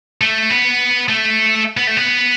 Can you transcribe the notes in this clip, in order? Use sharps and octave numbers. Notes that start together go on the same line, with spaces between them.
A3
B3
A3
B3
A3
B3